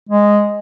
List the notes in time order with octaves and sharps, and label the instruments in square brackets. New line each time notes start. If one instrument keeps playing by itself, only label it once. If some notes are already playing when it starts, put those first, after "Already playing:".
[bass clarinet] G#3